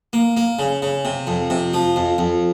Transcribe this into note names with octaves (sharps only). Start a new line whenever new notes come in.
A#3
A#3
C#3
C#3
C3
F2
C3
F3
F2
F2